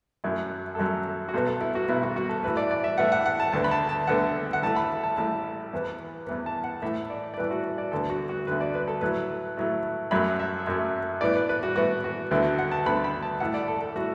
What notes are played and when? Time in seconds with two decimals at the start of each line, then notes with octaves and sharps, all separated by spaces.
0.24 F#2 F#3 A3 E4
0.75 A4
0.78 F#2 F#3 A3 F#4
1.28 F#4
1.33 B1 B2 B3 A4
1.47 A4
1.61 E4
1.75 F#4
1.89 B1 B2 B3 E4
2.03 F#4
2.16 F#4
2.29 A4
2.43 A2 E3 A3 B4
2.57 D5
2.71 D5
2.84 E5
2.98 A2 E3 A3 F#5
3.12 F#5
3.26 F#5
3.40 A5
3.52 D2 D3 B3 A5
3.64 B5
3.71 A5
3.89 A5
4.07 D2 D3 B3 F#5
4.53 F#5
4.62 A1 A2 A3 A5
4.76 B5
5.04 A5
5.17 A1 A2 A3 A5
5.73 E2 E3 B3
6.27 E2 E3 B3
6.46 A5
6.64 F#5
6.82 A2 E3 A3 E5
7.10 D5
7.34 D5
7.37 A2 E3 A3 B4
7.51 F#4
7.78 D5
7.92 D2 D3 B3 A4
8.10 F#4
8.29 F#4
8.47 D2 D3 B3 B4
8.61 D5
8.75 B4
8.88 A4
9.01 A2 F#3 A3 B4
9.57 A2 F#3 A3
10.11 F#2 F#3 A3 B5
10.39 E5
10.67 F#2 F#3 A3
11.21 A2 E3 B3 D5
11.35 B4
11.49 B4
11.63 F#4
11.76 A2 E3 B3 F#4
12.04 F#4
12.31 D2 D3 B3 E4
12.44 F#4
12.58 F#5
12.71 A5
12.86 D2 D3 B3 B5
13.04 B5
13.23 A5
13.40 A1 A2 A3 F#5
13.54 D5
13.68 A4
13.81 A4
13.96 A2 A3 F#4